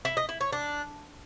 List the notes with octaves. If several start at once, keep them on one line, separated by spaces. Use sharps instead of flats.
E4
D#5
E4
C#5
D4